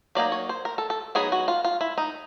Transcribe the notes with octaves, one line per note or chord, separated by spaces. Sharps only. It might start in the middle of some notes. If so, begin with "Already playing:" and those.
F#3 A#3 D#4 D5
C#5
C5
A#4
A4
A4
F#3 B3 D#4 G#4
F#4
F4
F4
E4
D#4